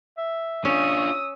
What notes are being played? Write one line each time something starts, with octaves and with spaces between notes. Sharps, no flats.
E5
C#4 D4 F4 D#6 E6